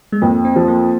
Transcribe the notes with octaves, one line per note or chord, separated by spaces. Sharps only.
G#3
F2 A#3
C4
F3
A#3